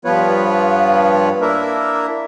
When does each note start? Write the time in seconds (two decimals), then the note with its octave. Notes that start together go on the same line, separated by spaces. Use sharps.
0.05 G2 F3 B3 F4 B4 C#5
1.41 A#3 D4 E4 A#4 E5